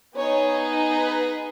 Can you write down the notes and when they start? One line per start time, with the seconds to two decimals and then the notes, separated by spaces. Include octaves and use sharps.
0.15 B3 D#4 G#4 C#5
0.94 B4